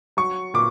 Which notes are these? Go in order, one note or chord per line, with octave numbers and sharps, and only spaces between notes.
F#3 C#6
A#2 D6